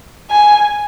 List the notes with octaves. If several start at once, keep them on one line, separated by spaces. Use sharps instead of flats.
G#5